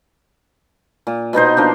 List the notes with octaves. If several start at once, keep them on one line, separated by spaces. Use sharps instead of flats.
A#2
B2 B3 D#4 C5
F3 A#3 D4